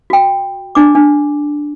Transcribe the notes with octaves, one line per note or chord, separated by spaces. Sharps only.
F#4 G5
D4 D6
D4